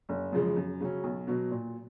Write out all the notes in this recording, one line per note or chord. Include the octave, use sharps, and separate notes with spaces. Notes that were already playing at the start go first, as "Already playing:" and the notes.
F#1
F#2 C#3 F3 G#3
F#2
C#3 F#3 C#4
B1
B2 F#3
A#2